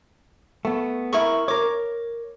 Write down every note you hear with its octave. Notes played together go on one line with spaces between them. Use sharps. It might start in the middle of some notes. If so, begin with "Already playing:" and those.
A3 B3
E4 A#4 C#6
A#4 C#5 D6